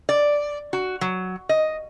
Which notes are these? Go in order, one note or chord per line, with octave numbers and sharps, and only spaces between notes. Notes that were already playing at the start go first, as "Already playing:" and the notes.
D5
F#4
F#3
D#5